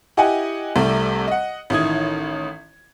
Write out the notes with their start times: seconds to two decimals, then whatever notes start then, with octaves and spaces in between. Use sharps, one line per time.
0.17 E4 G4 D#5 F#5 G#5
0.76 C2 C3 G3 A3
1.28 D#5 F#5
1.70 A1 D#3 E4 D#6 G#6